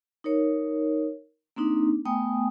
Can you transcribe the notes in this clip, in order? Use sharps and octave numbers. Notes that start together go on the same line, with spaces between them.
D#4 A#4 C#5
A#3 C4 D4 D#4
A3 B3 G5 G#5 D#6